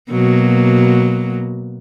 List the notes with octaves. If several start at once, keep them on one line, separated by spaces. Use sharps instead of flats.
B2 F#3 A#3